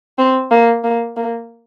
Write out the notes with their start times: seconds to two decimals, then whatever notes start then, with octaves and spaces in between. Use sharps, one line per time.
0.18 C4
0.51 A#3
0.84 A#3
1.17 A#3